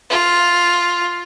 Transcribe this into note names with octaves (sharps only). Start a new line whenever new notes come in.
F4